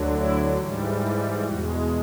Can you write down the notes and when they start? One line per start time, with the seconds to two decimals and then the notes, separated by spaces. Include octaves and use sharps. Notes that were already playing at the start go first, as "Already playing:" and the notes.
Already playing: D2 D3 F#3
0.13 E4
0.57 G#2 E3 G3
1.46 E2 B2 G#3 F#4